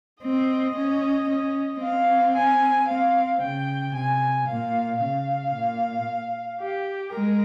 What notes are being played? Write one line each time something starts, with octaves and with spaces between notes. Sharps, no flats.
C4 D#5
C#4
C#4
C4 F5
G#5
C4 F5
C#3 G5
C3 G#5
A#2 F5
C#3 F5
A#2
G4
G#3 A#4